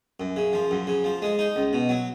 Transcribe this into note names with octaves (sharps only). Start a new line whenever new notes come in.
F#2
C#3
F3
F#2
C#3
F3
G#3
D#4
C#2
B2
F#3